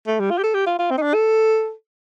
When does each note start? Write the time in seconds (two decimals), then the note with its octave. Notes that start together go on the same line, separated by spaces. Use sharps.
0.07 A3
0.20 G3
0.31 F4
0.38 G4
0.43 A4
0.54 G4
0.67 F4
0.79 F4
0.91 C4
0.98 D#4
1.02 D4
1.14 A4